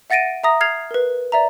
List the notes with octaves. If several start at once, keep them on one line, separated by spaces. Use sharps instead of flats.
E5 F#5 A6 A#6 D7 D#7
E5 A#5 D#6 A#6
F6 G#6 C7 F7
A#4 B4
D5 E5 A#5